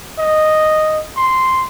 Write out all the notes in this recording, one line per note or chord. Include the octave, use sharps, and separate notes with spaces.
D#5
C6